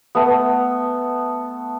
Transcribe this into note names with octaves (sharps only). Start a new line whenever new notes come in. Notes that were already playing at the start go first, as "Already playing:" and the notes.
A3 B3